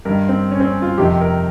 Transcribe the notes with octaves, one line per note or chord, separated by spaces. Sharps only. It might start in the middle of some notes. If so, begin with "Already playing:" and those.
G2 D#3 A#4
C4
C#4
C4
C#4
F4
F2 C3 D#3 G4
A#4